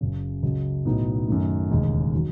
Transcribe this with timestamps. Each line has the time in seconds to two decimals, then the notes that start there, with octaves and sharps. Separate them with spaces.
0.01 F#1 F#2 C#3
0.43 C#2 C#3 F#3
0.85 B1 A2 F#3 B3 D#4
1.28 F#2 D#3 A3
1.70 E1 D#2 C#3 G#3
2.15 D#3 F#3